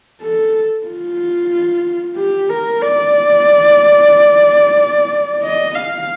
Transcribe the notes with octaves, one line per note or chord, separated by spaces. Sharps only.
A4
F4
G4
A#4
D5
D#5
F5